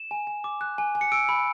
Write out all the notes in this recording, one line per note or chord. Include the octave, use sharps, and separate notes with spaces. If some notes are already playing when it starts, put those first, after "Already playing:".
Already playing: E7
G#5
G#5
D6
F#6
G#5
G#5
C#7
E6 D7
B5